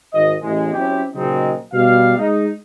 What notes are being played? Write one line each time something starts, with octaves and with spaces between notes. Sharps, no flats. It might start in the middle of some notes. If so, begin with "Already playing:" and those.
G#1 D#5
A1 G#3
F#3 C4 C#4 E4 G4
A#2 C#3 F#3 G#3 C4 D#4
B2 G3 F5
G#3 D#4